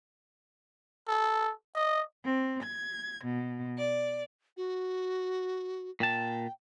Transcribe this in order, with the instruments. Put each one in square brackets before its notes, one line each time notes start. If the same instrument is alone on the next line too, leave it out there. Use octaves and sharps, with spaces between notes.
[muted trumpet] A4
D#5
[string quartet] C4
G#6
B2
D5
[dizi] F#4
[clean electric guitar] A#2 A5 [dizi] G5